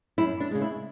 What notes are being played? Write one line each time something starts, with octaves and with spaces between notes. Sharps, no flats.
F#2 E4
D4
C#3 G#3
E4